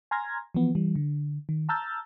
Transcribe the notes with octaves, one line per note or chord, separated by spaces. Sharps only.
G#5 A#5 C6 F6 G#6 A#6
E3 F3 B3
E3 G3
D3
D#3
A5 A#5 E6 F6 G6 A6